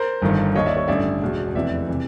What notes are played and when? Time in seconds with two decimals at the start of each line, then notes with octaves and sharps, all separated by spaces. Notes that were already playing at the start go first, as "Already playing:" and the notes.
Already playing: A#4 C5
0.22 G1 G2 D#3
0.55 D#2 D#3 C#5 D#5
0.66 D5 E5
0.77 C#5 D#5
0.88 A1 G2 D3 D5 E5
1.22 E1 E2 B2
1.54 F1 E2 C3 E3 D5 E5
1.88 C3 E3